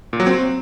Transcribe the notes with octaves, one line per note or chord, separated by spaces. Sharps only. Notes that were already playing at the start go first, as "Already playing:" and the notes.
A#2
F#3
C4